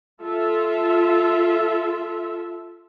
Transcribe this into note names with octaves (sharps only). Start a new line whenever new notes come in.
F4 A4 E5